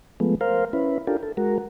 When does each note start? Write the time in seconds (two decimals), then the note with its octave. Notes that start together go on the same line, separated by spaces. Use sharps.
0.20 F3 G#3 A3 B3
0.41 A#4 C5 F5
0.73 C#4 E4 B4
1.07 D4 F4 G4 A4 A#4
1.23 A4
1.37 G#3 F#4 A#4